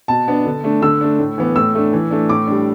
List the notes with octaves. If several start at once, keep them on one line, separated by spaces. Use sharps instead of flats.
B2 A5
B3 D4
D3
A3 D4
D3 E6
A3 D4
A2
E3 B3
A2 E6
A3 D4
E3
A3 D4
A2 D6
G3 D4